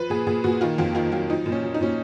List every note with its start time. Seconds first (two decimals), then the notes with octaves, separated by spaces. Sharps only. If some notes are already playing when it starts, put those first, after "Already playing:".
Already playing: F3 B4
0.10 A#2 G#4
0.27 A#2 G#4
0.44 A#2 F#4
0.61 D#3 F4
0.78 F2 F4
0.95 D#3 F4
1.12 F#3 F4
1.30 F3 D#4
1.46 A#2
1.52 C#4
1.63 F3
1.74 D#4
1.81 A#2 C#4